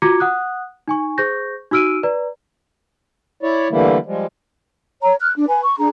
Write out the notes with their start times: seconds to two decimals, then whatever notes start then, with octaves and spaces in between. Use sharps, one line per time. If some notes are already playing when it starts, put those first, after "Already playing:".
0.02 F4 F#4 A#5 D6 G#6 C#7
0.20 F#5 D#6 F#6
0.88 D#4 G#5 C#6
1.18 G#4 C5 C#6 G6 A#6
1.71 D#4 F#4 E6 F6 D7 D#7
2.03 B4 D5 A#5
3.43 E4 C#5 D5
3.70 D3 E3 G3 A3 A#3 E4
4.06 F3 G3 G#3
5.02 C#5 A#5
5.20 F6 F#6
5.36 D4
5.49 B4 G#5
5.63 C#6
5.78 D4 G#4 A#5